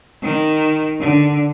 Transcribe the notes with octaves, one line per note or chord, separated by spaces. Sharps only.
D#3
D3